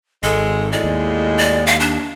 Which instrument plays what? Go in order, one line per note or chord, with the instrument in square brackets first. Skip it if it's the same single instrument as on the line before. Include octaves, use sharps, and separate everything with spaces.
[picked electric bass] G#1 [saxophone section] G#3 [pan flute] A4
[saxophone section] A2 G#3 [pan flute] D5
[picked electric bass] D#2
[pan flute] D5
F5
D4